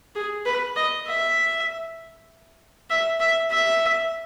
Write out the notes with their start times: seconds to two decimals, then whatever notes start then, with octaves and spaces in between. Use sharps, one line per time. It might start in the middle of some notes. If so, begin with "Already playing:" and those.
0.15 G#4
0.46 B4
0.76 D#5
1.07 E5
2.90 E5
3.20 E5
3.51 E5